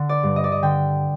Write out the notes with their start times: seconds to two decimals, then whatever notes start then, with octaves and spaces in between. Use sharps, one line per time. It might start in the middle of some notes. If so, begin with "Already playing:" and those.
Already playing: D3
0.09 D5
0.23 G2
0.36 D#5
0.44 D5
0.52 D#5
0.62 D3 G5